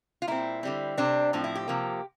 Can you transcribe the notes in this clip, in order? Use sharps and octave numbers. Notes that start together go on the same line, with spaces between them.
F4
A#2 G3 C4 E4
D3 G3 C4
C3 G3 C4 D4
A2 F3 C4 D4
E4
G4
C3 F3 A#3